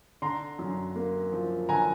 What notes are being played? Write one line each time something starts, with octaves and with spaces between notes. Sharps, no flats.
D3 A#5 C6
F#2
A#3
F3
D3 G#5 A#5